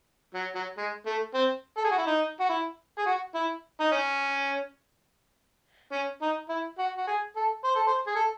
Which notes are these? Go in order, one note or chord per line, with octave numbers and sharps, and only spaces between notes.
F#3
F#3
G#3
A3
C4
A4
G#4
F#4
E4
D#4
F#4
E4
G#4
F#4
E4
D#4
C#4
C#4
D#4
E4
F#4
F#4
G#4
A4
C5
A4
C5
G#4
A4